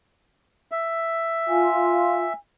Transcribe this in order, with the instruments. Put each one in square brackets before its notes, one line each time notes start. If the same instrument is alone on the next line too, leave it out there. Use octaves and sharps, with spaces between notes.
[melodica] E5
[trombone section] F4 [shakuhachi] G#5